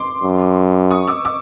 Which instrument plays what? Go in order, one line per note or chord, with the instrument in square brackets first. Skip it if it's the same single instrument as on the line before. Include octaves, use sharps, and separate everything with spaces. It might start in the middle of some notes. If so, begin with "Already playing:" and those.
Already playing: [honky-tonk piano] C6 D6
[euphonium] F#2
[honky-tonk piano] C#6 D#6
D6 E6
D6 E6